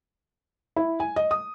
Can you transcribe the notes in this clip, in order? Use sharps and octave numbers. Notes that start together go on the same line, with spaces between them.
E4
G#5
D#5
D#6